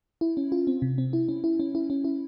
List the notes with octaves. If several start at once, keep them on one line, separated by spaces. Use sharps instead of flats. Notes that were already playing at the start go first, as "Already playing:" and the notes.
E4
C#4
F4
C4
C3
C4
E4
C#4
E4
C#4
E4
C#4
E4